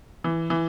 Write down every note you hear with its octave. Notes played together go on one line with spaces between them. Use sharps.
E3
E3